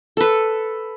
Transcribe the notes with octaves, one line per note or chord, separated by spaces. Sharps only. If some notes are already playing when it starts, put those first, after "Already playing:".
A4 B4